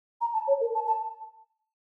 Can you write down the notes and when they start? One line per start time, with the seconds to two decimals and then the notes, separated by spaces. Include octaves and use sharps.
0.21 A#5
0.34 A5
0.48 C#5
0.61 A#4
0.75 A5
0.87 A5